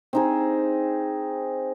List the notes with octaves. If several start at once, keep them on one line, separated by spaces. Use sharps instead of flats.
C4 D#4 G#4